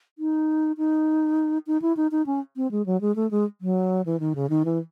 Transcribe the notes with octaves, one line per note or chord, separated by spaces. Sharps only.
D#4
D#4
D#4
E4
D#4
D#4
C#4
C4
G#3
F#3
G#3
A3
G#3
F#3
E3
D#3
C#3
D#3
E3